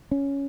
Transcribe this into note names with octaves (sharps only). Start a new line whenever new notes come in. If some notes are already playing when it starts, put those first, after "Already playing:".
C#4